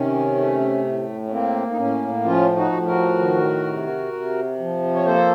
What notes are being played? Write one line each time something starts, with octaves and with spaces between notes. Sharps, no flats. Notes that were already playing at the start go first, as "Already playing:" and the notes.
Already playing: C3 D#3 C#4
A3
A2
C#4
A#3 C4
D#4
A2 C#4
F3 C#4 F4
D#4 F#4
A2
F#4 A#4
D#3
C3
C3
F3
C#5
A#3 A4 C5